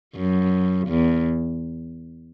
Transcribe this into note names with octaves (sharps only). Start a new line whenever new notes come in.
F#2
E2